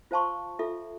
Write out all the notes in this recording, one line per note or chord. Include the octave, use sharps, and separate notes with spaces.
F4 C5 F5 A5 C6 C#6
F4 A4 E5